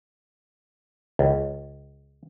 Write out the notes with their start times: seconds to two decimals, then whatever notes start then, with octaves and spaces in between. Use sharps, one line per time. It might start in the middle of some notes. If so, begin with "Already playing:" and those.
1.19 C#2